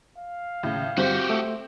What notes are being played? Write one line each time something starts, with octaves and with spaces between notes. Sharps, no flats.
F5
D#2 A2 C#3
G2 D3 C4 F#4 G4 G6
A3 E5